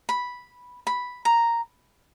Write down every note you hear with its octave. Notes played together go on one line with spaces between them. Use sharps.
B5
B5
A#5